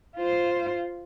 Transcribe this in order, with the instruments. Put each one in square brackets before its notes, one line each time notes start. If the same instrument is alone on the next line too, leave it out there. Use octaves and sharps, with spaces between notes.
[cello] F4 C5